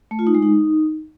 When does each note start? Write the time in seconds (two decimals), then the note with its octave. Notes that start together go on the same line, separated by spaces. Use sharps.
0.11 A3
0.19 F4
0.27 D#4
0.35 G#3
0.42 D#4